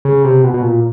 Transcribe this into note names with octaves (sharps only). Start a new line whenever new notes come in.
C#3
C3
B2
B2
A#2